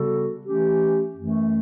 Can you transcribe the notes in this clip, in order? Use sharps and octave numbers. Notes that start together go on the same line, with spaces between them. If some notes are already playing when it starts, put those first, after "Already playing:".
Already playing: C#3 G3 B3 F#4 A4
E3 A3 C#4 G4
F#2 E3 A3